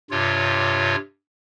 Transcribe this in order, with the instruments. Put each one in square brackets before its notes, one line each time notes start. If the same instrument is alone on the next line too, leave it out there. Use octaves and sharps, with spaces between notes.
[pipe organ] G2 C3 F4 C#5